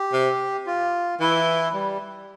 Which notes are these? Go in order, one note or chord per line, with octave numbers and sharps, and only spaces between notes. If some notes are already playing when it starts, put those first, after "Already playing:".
Already playing: G4
C3
F4
E3 E4
G3